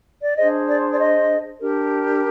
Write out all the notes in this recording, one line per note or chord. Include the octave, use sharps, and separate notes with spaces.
D5
D4 G#4 C5 D#5
D5
D5
D#5
D4 G4 A#4